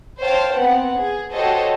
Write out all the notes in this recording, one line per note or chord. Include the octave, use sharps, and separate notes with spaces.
C5 C#5 F5 G5 A5
B3 C4 F#5
G#4
F#4 G4 A4 C5 C#5 D#5